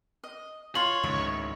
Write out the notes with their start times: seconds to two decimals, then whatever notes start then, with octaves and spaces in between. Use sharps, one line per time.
0.24 D#5
0.75 F4 C#5 C6 F#7
1.03 C#2 G#2 D#3 E5